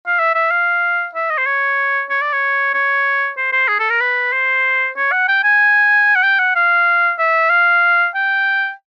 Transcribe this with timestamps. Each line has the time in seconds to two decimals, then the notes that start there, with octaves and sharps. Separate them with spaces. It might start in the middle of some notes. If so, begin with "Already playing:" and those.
0.07 F5
0.19 E5
0.35 E5
0.51 F5
1.14 E5
1.30 D#5
1.38 C5
1.46 C#5
2.10 C#5
2.21 D5
2.33 C#5
2.74 C#5
3.37 C5
3.53 C5
3.68 G#4
3.79 A4
3.90 A#4
4.01 B4
4.33 C5
4.96 C#5
5.12 F#5
5.28 G5
5.44 G#5
6.16 F#5
6.23 G5
6.39 F#5
6.55 F5
7.19 E5
7.50 F5
8.15 G5